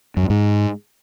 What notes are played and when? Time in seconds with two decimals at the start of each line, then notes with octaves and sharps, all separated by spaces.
0.17 F#2
0.23 G2
0.30 G#2